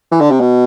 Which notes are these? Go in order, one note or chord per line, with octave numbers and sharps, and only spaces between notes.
E3
D3
C3
B2